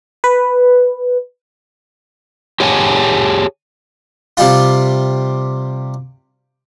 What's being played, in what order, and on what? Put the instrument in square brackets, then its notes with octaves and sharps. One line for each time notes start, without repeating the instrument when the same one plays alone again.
[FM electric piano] B4
[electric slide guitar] G4 G#4 C#5 F#5 G#5 A5
[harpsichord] C3 G3 F4